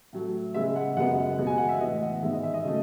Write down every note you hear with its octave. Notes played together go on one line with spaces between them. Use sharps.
A2 F#3 A3
C#3 G#3 B3 E5
F#5
F#2 C#3 G#3 B3 F#5
B2 G#3 B3
G#5
F#5
E5
A2 E3 B3 D#5
F#5
G#2 D#3 G#3 B3 E5
D#5
E5
D#5
C#3 F#3 A3